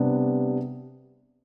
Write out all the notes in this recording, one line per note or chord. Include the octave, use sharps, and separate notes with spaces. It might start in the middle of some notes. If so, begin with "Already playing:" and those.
Already playing: C3 G3 B3 D4